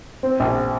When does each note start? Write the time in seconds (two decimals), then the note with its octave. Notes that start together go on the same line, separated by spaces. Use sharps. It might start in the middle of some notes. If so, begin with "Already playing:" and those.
0.23 C4
0.40 A#1